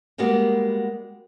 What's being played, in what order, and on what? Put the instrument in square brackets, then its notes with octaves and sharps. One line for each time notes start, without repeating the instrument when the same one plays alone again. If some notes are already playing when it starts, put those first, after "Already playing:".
[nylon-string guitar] G3 G#3 A#3 B3 F#4 G4